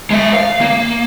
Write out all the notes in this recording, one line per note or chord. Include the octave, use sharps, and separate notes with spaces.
G#3 E5
F5
A#3